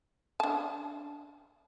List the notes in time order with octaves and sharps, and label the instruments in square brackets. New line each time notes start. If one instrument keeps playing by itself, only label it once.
[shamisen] D4 A5